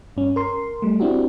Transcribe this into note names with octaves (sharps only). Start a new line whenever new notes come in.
G2 C#4
A#4 C6
G3 A3
C4 D4 E4 F#4 G4